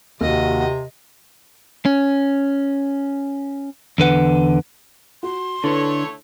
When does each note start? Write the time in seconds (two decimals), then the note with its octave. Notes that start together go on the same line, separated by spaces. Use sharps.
0.21 D#2 C3 F#4 D#5
1.85 C#4
3.98 E2 D3 B4 F#5
5.23 F#4 C6
5.64 D3 A3 E4 A4 B4 C#5